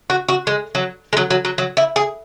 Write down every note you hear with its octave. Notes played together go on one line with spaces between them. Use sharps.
F#4
F#4
G#3
F#3
G#3
F#3
F#3
F#3
F#3
E4
G#4